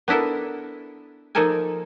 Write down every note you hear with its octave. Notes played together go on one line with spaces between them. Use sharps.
B3 D4 E4 A4 A#4
F3 A#3 D#4 A4 A#4 G#5